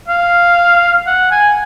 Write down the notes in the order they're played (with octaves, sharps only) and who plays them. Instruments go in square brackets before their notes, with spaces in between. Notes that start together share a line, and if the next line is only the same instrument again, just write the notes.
[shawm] F5
F#5
G#5